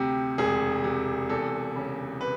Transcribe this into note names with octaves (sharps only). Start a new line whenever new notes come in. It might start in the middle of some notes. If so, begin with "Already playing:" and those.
Already playing: D2 C3 G4
E1 G#4
C3
E2 A4
C#3
B4